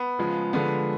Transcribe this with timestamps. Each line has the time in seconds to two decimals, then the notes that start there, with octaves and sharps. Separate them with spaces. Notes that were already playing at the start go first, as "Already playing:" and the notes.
Already playing: B3
0.18 C#3 F3 G#3
0.53 D3 F3 G#3 B3